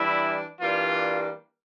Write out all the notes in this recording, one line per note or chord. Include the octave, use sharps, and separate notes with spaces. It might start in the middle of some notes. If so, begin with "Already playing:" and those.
Already playing: E3 G3 D4 E4
E3 G3 A#3 D4 F4